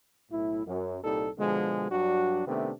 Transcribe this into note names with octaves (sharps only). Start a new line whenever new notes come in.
B1 A2 E4
F#2
C2 A#2 G3 D#4 A4
B2 D3 F3 G#3
G2 F#3 D4 F#4
C3 D#3 A3 B3 D4